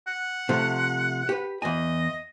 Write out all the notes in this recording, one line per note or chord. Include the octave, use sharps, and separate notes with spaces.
F#5
C3 F3 A3
G4 B4
E2 D#5 G#5